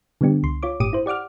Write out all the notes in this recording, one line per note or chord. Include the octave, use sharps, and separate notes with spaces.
D3 G3 B3 D4 G4
C#2 C6
F4 C#5 D6
G1 A2 G4 D6 D#6 D#7
E4 C5
G4 D5 F#5 D6 F6